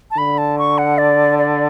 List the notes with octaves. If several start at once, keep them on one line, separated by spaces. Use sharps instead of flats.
A5
D3 B5
A5
C#6
F#5
D5
D5